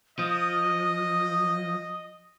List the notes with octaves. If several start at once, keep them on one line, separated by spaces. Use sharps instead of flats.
F3 D#5 D#6